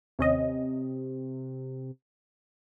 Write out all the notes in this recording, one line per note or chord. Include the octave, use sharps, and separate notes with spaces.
D#2 C3 C#4 D#5